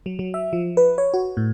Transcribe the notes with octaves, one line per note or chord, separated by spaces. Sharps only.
F#3
F#3
E5
F3
B4
C#5
F#4
A2